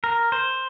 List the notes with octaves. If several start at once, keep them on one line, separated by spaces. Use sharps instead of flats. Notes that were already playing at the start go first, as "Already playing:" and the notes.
A#4
C5